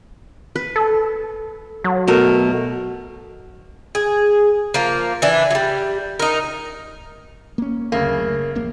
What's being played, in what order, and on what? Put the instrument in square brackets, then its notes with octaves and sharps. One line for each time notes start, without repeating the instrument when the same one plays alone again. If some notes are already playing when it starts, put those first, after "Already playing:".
[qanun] B4
[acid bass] A4
F#3
[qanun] B2 A3 A#4
[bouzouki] G#4
F3 A#3
E3 D4
F#3 G3
D#4 A#4
[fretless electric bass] A#3 C#4
[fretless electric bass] F#1 D2 [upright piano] C#3 A3 [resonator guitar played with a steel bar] A#3
[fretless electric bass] D#1 A#1 A#3